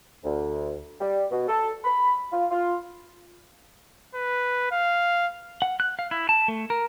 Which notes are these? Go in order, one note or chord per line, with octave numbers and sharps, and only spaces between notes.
D2
G3
B2
A4
B5
F4
F4
B4
F5
F#5
F#6
F5
E4
A5
A3
A#4